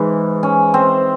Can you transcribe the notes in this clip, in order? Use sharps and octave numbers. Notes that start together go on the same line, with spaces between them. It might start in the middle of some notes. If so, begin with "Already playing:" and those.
Already playing: G#2 E3
C#4
C4